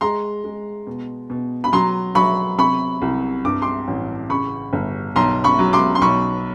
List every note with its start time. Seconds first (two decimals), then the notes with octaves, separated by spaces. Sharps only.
0.01 G#3 A#5 C6
0.44 G#3
0.87 B2
1.30 B2
1.64 B5
1.73 F#3 A#5 C6
2.15 F#3 B5 C#6
2.58 C3 B5 C#6
3.02 C2
3.45 G2 D6
3.62 C6 D6
3.88 A1
4.30 C#3 B5 C#6
4.73 G1
5.16 B1 A#5 C6
5.44 B5 C#6
5.59 F#3
5.73 C6 D6
5.95 C6
6.01 B1 B5 C#6